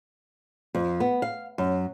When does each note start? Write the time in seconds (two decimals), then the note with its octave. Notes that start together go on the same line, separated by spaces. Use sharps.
0.75 F2
1.00 B3
1.22 F5
1.58 F#2